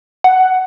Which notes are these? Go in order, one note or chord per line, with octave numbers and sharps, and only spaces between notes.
F#5